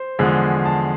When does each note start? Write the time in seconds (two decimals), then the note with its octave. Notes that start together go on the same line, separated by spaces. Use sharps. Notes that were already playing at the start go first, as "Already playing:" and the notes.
Already playing: C5
0.19 E2 D3 F3 G#3
0.65 A5